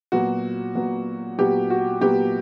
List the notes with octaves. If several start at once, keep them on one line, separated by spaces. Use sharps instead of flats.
A#2 F#3 B3 F#4
A#2 F#3 B3
A#2 F#3 B3 G4
F#4
A#2 F#3 B3 G4